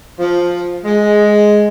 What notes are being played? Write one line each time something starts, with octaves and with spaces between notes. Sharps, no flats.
F3
G#3